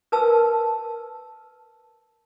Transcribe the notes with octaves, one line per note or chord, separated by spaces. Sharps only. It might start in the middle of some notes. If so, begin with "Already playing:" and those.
A#4 B4 A5 E6